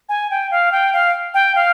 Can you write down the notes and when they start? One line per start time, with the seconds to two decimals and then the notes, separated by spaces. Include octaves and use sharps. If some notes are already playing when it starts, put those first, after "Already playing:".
0.09 G#5
0.31 G5
0.51 F5
0.72 G5
0.93 F5
1.34 G5
1.55 F5